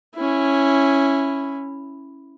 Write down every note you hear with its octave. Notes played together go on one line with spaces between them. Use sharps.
C#4 E4